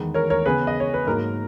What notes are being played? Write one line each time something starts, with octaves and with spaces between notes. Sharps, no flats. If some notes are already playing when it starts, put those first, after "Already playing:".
Already playing: E2 D#3 G#3 B3
A#4 C#5
A#4 C#5
C#3 G#3 B3 G#4 B4
D#5
C#5
B4
G#2 F#3 A#3 A#4